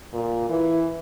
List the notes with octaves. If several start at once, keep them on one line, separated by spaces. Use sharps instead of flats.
A#2
E3